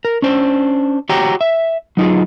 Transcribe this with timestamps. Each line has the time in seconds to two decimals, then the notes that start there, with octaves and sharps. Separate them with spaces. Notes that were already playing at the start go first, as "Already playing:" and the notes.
0.05 A#4
0.22 C#4 D4 C5
1.09 F#4 G4 C#5 G5 A#5
1.41 E5
1.97 F#3 D#4 F4 G#4